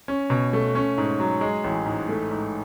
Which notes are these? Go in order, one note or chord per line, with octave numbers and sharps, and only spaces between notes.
C#4
B2
A3
C#4
G#2
F#3
G#3
A1
G#2
A3
G#2